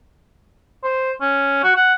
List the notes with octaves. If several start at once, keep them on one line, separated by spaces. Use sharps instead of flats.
C5
C#4
F#4
F#5